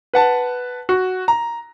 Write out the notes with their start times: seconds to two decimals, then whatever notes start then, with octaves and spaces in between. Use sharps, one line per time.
0.14 B4 F#5 A5
0.89 F#4
1.28 A#5